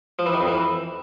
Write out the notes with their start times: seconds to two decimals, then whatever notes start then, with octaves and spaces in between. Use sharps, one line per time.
0.19 F3
0.26 E3
0.33 D#3
0.41 F2
0.48 E3